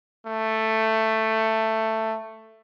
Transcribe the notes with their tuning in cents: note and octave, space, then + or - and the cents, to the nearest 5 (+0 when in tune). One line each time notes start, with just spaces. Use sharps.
A3 +10